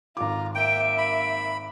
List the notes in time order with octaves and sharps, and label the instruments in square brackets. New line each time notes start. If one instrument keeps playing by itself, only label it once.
[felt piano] G#1 D6 [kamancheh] F4 A#5
[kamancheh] A#3 E5 [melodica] G5 [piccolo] D7
[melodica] B5